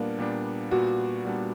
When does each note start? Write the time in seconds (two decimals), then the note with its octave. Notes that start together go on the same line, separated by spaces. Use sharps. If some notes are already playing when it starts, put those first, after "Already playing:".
Already playing: A#2 G3 A#3 B3 D4
0.18 A#2 G3 B3 D4
0.71 A#2 G3 B3 D4 F#4
1.25 A#2 G3 B3 D4